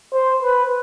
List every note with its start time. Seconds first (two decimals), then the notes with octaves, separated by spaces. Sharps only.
0.13 C5
0.43 B4